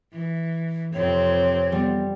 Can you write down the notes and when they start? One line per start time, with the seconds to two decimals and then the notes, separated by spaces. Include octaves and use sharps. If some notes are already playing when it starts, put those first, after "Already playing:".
0.13 E3
0.94 F2 C3 C4 C#5
1.72 G3 B3